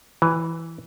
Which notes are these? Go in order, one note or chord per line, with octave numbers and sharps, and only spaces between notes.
E3